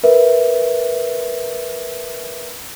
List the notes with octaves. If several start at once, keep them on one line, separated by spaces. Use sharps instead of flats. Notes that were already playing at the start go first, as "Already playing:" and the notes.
A#4 B4 E5